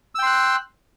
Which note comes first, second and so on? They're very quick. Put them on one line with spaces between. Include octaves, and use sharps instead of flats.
E6 G5 C6 F#6